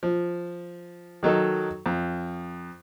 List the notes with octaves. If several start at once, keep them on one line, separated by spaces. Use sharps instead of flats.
F3
D#3 F#3 D#4 A4
F2